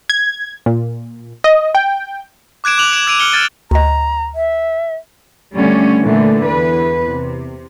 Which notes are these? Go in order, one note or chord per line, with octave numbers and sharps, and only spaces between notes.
G#6
A#2
D#5
G5
D6 F#6 G#6 D7 E7
D6 F#6 F7 F#7
D7 F#7
E6 G#6 D7 D#7 F7
F6 C#7 G7
F6 G#6 A6 D#7
D2 D#5 A#5
E5
D3 G3 A3 C#4
A#2 D3 E3 A3
E2 B4
C3